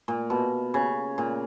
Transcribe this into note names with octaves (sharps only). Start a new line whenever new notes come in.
A#2
B2
C#3
A#2